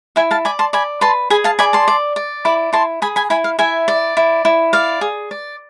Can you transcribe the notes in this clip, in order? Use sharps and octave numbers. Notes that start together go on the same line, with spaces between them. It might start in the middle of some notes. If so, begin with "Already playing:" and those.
E4 E5 G#5
F5 A5
D5 G#5 B5
A5 C6
D5 G#5 B5
B4 A5 C6
G#4 G#5 B5
F5 A5
D5 G#5 B5
A5 C6
D5
D5
E4 B5 D6
E4 A5 C6
G#4 G#5 B5
G#5 B5
E4 G#5 B5
F5
E4 E5 G#5
D5
E4
E4
D5 F5
G#4
D5